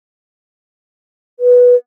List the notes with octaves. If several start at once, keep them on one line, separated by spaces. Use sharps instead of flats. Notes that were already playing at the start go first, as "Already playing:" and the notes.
B4